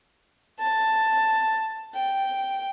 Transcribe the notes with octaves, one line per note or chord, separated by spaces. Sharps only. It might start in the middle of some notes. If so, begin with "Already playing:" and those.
A5
G5